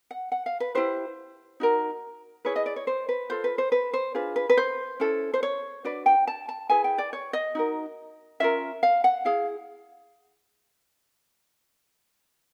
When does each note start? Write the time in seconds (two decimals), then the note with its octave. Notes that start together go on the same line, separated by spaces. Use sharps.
0.11 F#5
0.32 F#5
0.46 F5
0.60 B4
0.75 E4 G4 B4 C5
1.60 D#4 F#4 A#4
2.45 E4 G#4 B4 C#5
2.56 D#5
2.66 D5
2.76 C#5
2.87 C5
3.09 B4
3.30 F4 A4 C5
3.44 B4
3.58 C5
3.72 B4
3.94 C5
4.15 D4 F4 G#4 B4
4.36 B4
4.50 B4
4.57 C5
5.00 C#4 E4 A4
5.34 C5
5.43 C#5
5.84 D4 F#4 B4 D5
6.06 G5
6.27 A5
6.49 A5
6.70 E4 G#4 B4 G#5
6.84 G5
6.98 D5
7.13 C#5
7.33 D#5
7.55 D#4 F#4 A#4
8.40 C#4 F4 A#4 E5
8.83 F5
9.04 F#5
9.25 E4 G#4 F5